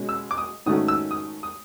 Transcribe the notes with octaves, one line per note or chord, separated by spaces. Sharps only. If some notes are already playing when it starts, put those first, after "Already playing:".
Already playing: B2 G#3 C#4
E6
D6
D#6
G#2 D#3 F#3 A3 C#4 D#6
E6
D#6
D#6